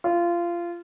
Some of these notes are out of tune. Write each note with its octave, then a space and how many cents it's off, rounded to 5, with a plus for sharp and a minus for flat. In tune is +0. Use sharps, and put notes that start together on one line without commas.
F4 -20